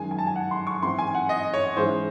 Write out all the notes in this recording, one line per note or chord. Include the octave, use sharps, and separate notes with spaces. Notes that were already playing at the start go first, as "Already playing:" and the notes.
Already playing: F#2 D#3 G#3 G#5
G#5
A5
G#5
F#5
C6
C#6
G#2 E3 C4 C6
G#5
F#5
D#5
C#5
G#2 E3 G#3 C#4 C5